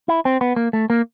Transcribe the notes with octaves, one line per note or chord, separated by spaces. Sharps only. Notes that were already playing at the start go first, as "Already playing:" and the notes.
E4
C4
B3
A#3
A3
A#3